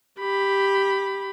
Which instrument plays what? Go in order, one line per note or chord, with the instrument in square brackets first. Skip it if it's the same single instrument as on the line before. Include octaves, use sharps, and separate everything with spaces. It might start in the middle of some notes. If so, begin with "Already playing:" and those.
[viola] G4 B5